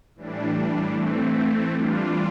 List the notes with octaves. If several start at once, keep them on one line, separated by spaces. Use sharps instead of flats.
A2 E3 G3 D4
E3 A3 C4
E3 G3 D4 F4